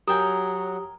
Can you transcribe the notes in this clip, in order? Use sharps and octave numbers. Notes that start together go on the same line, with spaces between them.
F#3 G4 A#4 G5 G#5 D#6